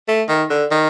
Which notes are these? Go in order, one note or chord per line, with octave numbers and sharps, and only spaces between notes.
A3
D#3
D3
D#3